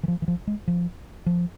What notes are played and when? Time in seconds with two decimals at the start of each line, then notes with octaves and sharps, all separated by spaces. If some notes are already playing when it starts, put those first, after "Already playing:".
0.03 E3
0.08 F3
0.22 E3
0.28 F3
0.47 G#3
0.68 F3
1.26 F3